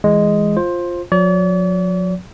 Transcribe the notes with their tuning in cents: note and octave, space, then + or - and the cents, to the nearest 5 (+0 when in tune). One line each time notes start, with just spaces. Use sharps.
E3 +0 G#3 +0 D#5 +0
F4 +0 C5 +15
F#3 -45 D5 -45